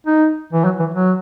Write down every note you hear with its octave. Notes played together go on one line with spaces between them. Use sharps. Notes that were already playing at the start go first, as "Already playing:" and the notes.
D#4
E3
F#3
E3
F#3